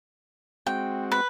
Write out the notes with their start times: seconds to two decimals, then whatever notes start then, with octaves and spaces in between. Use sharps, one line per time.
0.67 G#3 C4 F#4 G5
1.12 B4